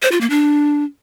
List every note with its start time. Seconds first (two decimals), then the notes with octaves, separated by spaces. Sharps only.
0.02 C5
0.12 F4
0.21 A#3
0.30 D4